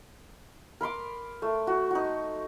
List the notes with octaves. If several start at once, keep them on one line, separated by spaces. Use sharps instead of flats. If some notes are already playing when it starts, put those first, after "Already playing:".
A#4 B5 C6 D6
A3
F#4
D#4 F#4